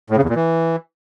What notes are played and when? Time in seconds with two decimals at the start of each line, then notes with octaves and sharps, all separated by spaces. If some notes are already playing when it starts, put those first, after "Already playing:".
0.10 A2
0.17 C#3
0.23 E2
0.29 A#2
0.36 E3